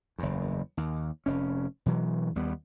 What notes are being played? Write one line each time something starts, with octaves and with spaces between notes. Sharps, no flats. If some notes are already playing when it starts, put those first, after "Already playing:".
F#1 E2
D#2
F1 C#4
B2 E3 F#3
D#2 G3 B3